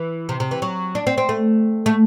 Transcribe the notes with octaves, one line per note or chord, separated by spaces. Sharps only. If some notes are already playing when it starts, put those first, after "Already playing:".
Already playing: E3
C3
C3
E3
F#3
D4
C4
C4
A3
A3